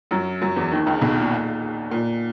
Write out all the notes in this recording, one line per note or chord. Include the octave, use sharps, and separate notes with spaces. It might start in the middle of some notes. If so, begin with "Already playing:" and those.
F#2 F#3
F#2 F#3
E2 E3
D#2 D#3
C#2 C#3
B1 B2
A#2
A#2